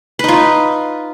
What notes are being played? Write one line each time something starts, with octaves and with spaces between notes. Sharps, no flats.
D#4 F4 B4